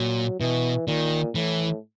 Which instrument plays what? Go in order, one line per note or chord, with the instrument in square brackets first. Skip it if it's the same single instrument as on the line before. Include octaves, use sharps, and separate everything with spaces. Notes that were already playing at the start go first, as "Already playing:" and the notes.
Already playing: [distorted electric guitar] A#2 [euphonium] F#3
[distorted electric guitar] B2 [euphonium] E3
[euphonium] A#2 [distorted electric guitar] D#3
[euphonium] A2 [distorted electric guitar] E3